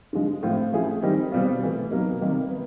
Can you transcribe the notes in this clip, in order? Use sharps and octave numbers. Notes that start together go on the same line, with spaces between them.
D3 F3 G#3
A2 F3 A3 C4 F4
F3 A3 C#4 E4 G#4
D#3 G3 C4 D#4 G4
B2 G3 C4 F4
C3 E3 A3
B2 F#3 A#3 D#4
C3 D#3 G3 A#3
B3